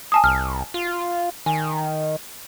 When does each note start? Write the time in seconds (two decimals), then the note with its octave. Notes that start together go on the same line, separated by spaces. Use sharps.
0.12 G#5 A5 D#6
0.24 C2 F6
0.74 F4
1.46 D#3 G#5